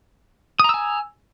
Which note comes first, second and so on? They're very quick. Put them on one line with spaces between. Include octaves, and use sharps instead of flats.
D#6 A#5 E6 G#5